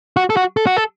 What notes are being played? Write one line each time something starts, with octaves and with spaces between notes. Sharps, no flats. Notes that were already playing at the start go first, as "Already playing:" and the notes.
F#4
A4
F#4
A4
F#4
A4